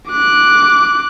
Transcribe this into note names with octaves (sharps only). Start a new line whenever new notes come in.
D6 F#6